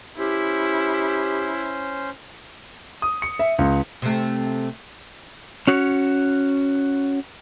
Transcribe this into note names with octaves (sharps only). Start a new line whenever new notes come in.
C#4 E4 G4 C5
D#6
C#7
E5
C#2
C3 A3
C#4 F#4 C#5